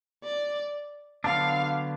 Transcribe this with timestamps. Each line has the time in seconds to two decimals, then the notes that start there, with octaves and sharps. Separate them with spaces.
0.24 D5
1.24 D3 F#3 B3 D4 F5